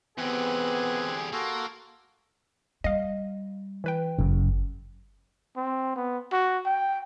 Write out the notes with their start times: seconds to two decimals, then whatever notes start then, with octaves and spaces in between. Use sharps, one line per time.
0.18 E2 D3 B3 C4 G4 G#4 G#5 F#6
1.33 A#3 F#4 A4 C6
2.84 G3 D#5 F5
3.84 E3 B4 G5
4.19 G1 F#2 C#3
5.57 C4
5.96 B3
6.32 F#4
6.66 G5